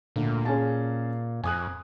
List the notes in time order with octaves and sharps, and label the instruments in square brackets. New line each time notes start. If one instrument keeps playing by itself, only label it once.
[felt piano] D2 [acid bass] A#2
[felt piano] C#4 G#4 A5
[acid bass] F2 [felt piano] G#5 D#6 F#6